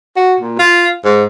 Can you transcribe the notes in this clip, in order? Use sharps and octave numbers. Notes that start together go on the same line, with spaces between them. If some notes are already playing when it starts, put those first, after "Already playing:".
F#4
A#2
F4
G#2